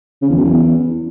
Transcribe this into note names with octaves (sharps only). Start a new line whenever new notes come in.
C#3
E2
F#2
E2